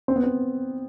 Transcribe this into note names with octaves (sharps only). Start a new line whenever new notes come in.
C4
B3
C4